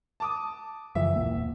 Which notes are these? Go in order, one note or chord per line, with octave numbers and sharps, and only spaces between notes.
A5 D6 D#6
F#1 E3 F3 E5
D#1 D#2 A#3